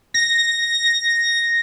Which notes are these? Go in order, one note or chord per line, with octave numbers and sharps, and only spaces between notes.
A#6